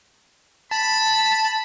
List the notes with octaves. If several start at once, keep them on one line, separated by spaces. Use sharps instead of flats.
A5 B5